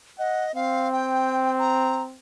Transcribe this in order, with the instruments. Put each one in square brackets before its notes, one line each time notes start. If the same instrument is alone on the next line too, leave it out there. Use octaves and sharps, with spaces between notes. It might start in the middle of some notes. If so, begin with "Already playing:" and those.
[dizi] D#5 [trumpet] F#5
[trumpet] C4 [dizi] F5
[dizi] G5
A#5